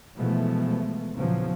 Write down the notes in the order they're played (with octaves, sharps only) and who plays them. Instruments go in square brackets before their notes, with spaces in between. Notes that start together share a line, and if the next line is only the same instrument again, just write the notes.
[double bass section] B2 E3 F3 G#3 A3 B3
E2 A#2 C#3 F3 F#3